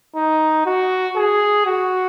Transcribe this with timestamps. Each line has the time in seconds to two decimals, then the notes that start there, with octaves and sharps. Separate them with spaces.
0.16 D#4
0.66 F#4
1.16 G#4
1.66 F#4